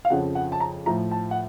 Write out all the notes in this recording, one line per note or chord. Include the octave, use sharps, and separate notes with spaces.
F5
F2 C#3 F3 F#5
F#5
A5
A#5
A2 F3 A#5
A5
F#5